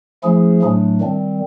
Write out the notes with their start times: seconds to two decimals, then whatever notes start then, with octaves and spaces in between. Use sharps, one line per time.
0.23 F3 A3 C#4 E4 G#4
0.62 A2 F#3 A3 D4
1.00 D#3 G3 C4